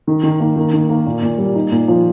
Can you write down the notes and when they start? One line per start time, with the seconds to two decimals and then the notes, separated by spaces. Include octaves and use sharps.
0.07 D#3
0.23 D#3
0.40 A#3
0.56 D#3
0.74 D#3
0.90 A#3
1.06 A#2
1.22 A#2
1.38 G3
1.55 D#4
1.72 A#2
1.88 F3